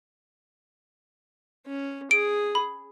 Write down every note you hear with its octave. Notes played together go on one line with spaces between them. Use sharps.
C#4
G#4 D7
B5